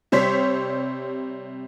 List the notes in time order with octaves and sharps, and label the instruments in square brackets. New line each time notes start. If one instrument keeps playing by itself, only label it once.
[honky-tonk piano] C3 G3 C5 C#5 B6